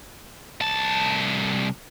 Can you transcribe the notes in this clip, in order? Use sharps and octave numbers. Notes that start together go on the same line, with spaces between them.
C2 A5